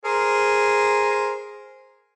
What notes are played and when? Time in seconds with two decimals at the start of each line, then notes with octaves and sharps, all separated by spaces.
0.05 G#4 A#4 C5